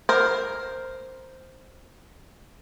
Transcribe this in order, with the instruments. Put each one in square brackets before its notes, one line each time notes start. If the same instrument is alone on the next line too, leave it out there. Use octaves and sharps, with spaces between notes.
[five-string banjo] A#4 C5